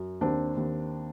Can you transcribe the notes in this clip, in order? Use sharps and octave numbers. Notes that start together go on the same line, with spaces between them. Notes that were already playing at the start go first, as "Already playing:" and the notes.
Already playing: F#2
D#2 C4 D4
D#2